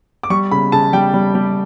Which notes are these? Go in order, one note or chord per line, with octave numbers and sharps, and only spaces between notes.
D6
G3 C#6
C#3 B5
C#3 A5
G3 G5
G3
G3